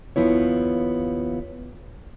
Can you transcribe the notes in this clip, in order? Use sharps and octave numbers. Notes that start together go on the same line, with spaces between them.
D#2 A#2 F3 B3 E4 C#5